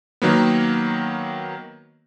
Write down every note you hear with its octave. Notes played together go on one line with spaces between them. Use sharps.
D#3 F#3 A#3 B3